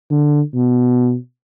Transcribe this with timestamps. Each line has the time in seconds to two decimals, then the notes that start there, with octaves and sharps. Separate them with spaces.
0.11 D3
0.54 B2